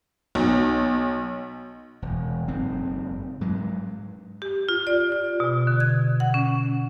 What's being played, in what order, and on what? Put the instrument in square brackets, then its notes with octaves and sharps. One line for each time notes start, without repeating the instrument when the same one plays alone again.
[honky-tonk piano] B1
[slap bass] E1
F#1 G#2 C4
G#2 F#3 G#3
[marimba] G4
F4
D5
F4
B2
D3
G#6
F#5
C#4